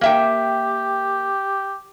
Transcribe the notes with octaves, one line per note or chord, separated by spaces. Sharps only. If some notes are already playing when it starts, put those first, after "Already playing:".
A#3 G4 E5 G5